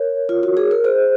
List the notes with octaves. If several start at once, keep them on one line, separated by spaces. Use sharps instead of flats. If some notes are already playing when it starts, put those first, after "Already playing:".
Already playing: A#4 C#5
F4
F#4
G#4
A#4
G#4 C5